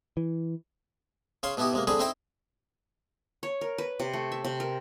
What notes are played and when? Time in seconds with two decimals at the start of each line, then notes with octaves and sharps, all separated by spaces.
0.17 E3
1.43 C#3 C#5 F5 C6
1.57 B2 B3 D#4 E4 G4
1.73 C3 G#3 A#3
1.87 D3 G#3 C4 G#4 B5
1.99 C4 D#4 E4 C5 G5 A#5
3.43 C#5
3.61 A#4
3.78 B4
4.00 C3
4.13 A3
4.32 E5
4.44 C3
4.60 A#4